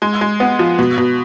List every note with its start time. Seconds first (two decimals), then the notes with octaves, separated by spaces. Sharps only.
0.02 G#3
0.21 G#3
0.40 B3
0.59 F3
0.79 B2
0.98 B2